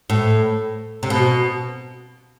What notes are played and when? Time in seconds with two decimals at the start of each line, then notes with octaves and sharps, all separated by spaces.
0.10 A2
1.03 C3
1.10 B2